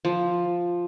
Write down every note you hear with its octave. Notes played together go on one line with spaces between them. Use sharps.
F3